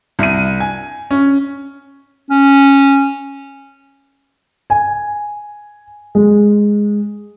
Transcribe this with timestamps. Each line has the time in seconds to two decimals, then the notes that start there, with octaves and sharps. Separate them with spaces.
0.19 C2 D#7
0.60 G#5
1.11 C#4
2.30 C#4
4.70 G#5
6.15 G#3